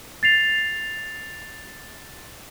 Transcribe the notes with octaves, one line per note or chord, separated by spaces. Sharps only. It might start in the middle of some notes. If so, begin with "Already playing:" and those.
A6 C7 F7